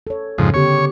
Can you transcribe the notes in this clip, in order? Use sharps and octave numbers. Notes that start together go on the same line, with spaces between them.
A4 C#5
F2 G#2 C#3
D3 B3 G4 C#5